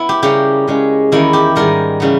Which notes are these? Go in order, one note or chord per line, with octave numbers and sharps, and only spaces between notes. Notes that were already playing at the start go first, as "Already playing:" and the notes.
Already playing: B3 E4
G4
C#3 G3 A#3 C#4 G4
C#3 G#3 C#4
E2 D#3 A#3 C#4 E4
G4
G#2 D#3 G3 B3 A#4
C#3 E3 G3 B3